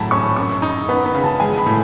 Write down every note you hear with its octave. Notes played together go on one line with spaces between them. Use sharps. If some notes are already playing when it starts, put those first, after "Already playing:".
Already playing: A2 F#3 A5 B5
C#4 C#6
F#2 C#6
D#4
B3 B5
B5
C#3
A5
G#3 G#5
B5
A2